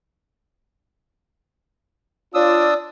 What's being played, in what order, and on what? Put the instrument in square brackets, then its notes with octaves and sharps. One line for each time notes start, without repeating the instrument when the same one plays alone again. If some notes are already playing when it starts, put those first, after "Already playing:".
[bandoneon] D4 D#6 E6 [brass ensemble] F4 C#5 [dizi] D5